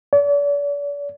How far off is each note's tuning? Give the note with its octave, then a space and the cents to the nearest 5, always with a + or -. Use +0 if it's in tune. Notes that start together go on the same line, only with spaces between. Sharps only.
D5 -40